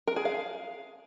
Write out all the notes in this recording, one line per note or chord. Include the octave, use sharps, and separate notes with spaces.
A#4
G#4
F5